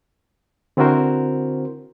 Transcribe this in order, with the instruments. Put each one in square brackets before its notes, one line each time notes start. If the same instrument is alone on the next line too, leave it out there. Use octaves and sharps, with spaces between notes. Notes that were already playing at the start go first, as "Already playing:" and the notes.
[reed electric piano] D3 C4 E4 F#4 A#4 C5